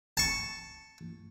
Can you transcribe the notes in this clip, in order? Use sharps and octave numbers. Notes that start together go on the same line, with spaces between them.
A5 C#6